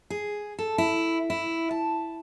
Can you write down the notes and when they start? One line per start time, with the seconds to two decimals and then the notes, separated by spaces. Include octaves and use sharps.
0.10 G#4
0.59 A4
0.78 E4
1.30 E4
1.71 A5